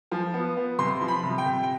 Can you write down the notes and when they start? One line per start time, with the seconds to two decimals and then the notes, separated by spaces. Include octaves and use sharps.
0.12 F3
0.34 B3
0.57 B3
0.79 C3 C6
1.01 F3
1.08 B5
1.23 C3
1.38 G5
1.46 C3
1.63 G5